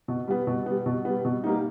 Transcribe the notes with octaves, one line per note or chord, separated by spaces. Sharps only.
B2
G3 B3
B2
G3 B3
B2
G3 B3
B2
G3 A#3 D#4